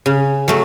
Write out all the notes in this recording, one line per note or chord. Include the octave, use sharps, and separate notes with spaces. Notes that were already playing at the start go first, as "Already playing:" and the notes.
C#3
F#3 A3